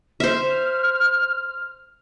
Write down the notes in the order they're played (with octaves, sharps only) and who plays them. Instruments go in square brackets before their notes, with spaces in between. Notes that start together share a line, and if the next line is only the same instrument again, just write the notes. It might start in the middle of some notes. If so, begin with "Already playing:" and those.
[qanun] C5 E5 [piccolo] F6